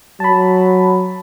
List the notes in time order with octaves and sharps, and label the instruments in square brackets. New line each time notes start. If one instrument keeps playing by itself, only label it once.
[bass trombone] F#3 [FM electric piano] A5 B5